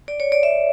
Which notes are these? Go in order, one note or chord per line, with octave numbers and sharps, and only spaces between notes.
D5
C#5
D5
E5